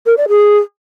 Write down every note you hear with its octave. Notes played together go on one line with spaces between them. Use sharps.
A#4
D5
G#4